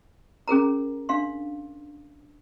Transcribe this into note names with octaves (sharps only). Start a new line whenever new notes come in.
C#4 G#4 A#4 A#5
D4 F5 C6